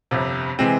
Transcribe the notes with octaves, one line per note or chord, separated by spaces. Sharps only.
G1 F2 C3
C3 E3 G#3 C4